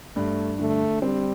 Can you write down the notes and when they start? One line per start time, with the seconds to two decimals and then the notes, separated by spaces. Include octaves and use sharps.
0.16 G2 A3
0.59 D3 A3
1.02 G3 C4